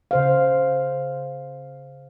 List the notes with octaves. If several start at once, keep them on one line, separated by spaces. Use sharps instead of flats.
C#3 C5 F5